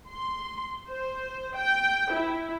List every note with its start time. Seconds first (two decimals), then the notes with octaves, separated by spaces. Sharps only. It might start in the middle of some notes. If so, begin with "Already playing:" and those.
0.10 C6
0.89 C5
1.55 G5
2.11 E4